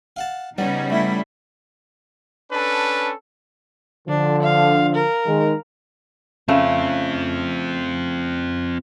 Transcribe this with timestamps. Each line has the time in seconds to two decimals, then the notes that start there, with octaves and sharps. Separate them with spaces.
0.16 F5 F#5 A5
0.58 C#3 G3 B3 C#4 D#4
0.90 A3 E4
2.52 C#4 D4 A4 B4
4.08 D3 F3 D4
4.42 F5
4.95 A#4
5.26 D#3 G#3
6.48 C#3 A3 C4 F4